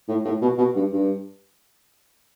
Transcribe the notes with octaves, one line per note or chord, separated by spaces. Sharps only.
A2
A2
B2
B2
G2
G2